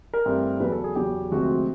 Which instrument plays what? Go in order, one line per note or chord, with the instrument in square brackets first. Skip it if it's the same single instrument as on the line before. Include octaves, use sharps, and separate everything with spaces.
[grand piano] A#4
G2 E3 A3 C4
E2 C#3 F#3 B4
A4
G#4
E2 C#3 F#3 G4
D2 C3 F3 G#3 C4 F#4